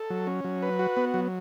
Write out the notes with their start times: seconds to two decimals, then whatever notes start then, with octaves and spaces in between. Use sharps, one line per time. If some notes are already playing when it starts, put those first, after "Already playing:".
Already playing: A4
0.10 F#3
0.27 C#4
0.44 F#3
0.62 B4
0.79 F#4
0.97 B3
1.14 F#3